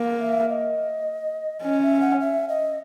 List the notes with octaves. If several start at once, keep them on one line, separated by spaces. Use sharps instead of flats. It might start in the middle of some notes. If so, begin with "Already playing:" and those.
Already playing: A#3
E5
D#5
C#4 D#5
E5
F#5
E5
D#5